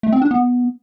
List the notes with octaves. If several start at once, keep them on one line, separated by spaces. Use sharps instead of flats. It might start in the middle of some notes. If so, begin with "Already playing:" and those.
A3
C4
D4
B3